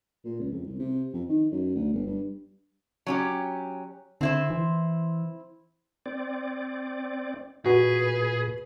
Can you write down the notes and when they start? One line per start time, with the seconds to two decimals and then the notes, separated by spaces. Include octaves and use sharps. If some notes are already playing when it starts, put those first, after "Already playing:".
0.25 A#2
0.39 C#2
0.51 F2
0.66 C2
0.79 C3
1.13 F2
1.29 D#3
1.52 F#2
1.75 D2
1.93 G1
2.06 G2
3.06 F#3 C#4 G4
4.21 D3 C4 E4 C5
4.50 E3
6.06 C4 D5
7.66 A#2 F#4 G#4 B4